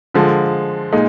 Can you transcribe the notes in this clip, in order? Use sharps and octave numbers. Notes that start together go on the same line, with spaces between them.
D3 F3 G#3
A#2 G#3 D#4